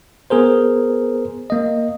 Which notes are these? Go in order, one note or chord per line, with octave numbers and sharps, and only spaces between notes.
B3 G#4 A#4 C5
A#3 D#5